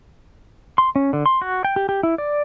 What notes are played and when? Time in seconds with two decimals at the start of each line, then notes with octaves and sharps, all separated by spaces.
0.78 C6
0.96 C#4
1.13 D3
1.26 C6
1.42 F#4
1.65 G5
1.76 G4
1.89 G4
2.03 E4
2.18 D5